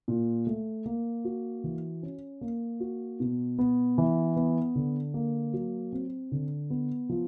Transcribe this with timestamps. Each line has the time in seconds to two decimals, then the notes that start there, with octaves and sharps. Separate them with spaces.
0.08 A#2
0.47 A3
0.86 A#3
1.25 F#4
1.64 E3
2.03 C#4
2.41 A#3
2.80 F#4
3.20 B2
3.59 B3
3.98 E3
4.36 B3
4.75 D3
5.14 A#3
5.53 F#3
5.93 C4
6.32 D3
6.70 B3
7.09 F3